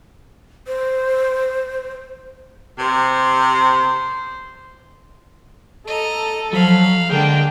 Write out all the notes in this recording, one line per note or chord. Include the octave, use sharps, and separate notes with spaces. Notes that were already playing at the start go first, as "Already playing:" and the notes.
C5
C3 C5
A4 D#5 A#5
F3 F#3 F5 B5
D3 G#3 A#3 D4 G5